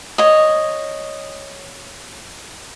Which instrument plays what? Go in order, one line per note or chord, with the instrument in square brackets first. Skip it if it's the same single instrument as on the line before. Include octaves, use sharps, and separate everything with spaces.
[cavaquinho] C#5 D#5